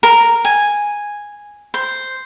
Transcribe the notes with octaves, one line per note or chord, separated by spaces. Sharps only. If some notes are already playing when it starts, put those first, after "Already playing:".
A#4
G#5
C5